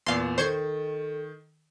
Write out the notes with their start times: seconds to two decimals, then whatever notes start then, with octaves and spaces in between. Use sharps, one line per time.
0.06 E2 A#2 F5 C6
0.38 D#3 A4 C5 C#6 G#6